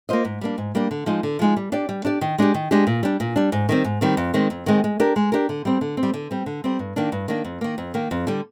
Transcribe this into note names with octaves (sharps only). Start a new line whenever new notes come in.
A#3 F4 C5 D#5
G#2
G3 A#3 D4
G#2
G3 A#3 D4
D3
F3 G#3 D#4
D3
F3 G#3 D#4
G3
D4 G4 D5
G3
D4 G4 D5
D#3
G#3 D4 G4
D#3
G#3 D4 G4
A#2
G3 D4
A#2
G3 D4
G#2
D#3 G3 C4
G#2
D#3 G3 C4
F2
D#3 G#3 C4
F2
D#3 G#3 C4
G#3
D4 G4 A#4
G#3
D4 G4 A#4
D3
G3 C4
D3
C4
G3
D3
G3 C4
D3
G3 C4
G2
D#3 A#3 D4
G2
D#3 A#3 D4
F2
D#3 A#3
F2
D#3 A#3
F2
D3 G3